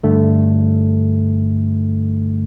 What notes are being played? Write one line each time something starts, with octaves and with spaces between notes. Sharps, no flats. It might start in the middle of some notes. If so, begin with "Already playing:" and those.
G2 D3 A3